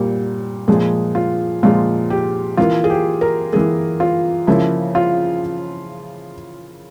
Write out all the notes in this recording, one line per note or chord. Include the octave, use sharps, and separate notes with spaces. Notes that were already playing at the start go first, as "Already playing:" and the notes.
Already playing: A#2 G3 A#3
A#2 F3 G#3 G#4
F4
A#2 F3 G#3 F4
G4
E3 A#3 F4
G#4
G4
A#4
E3 A#3 G#4
F4
C#3 F3 A#3 E4
F4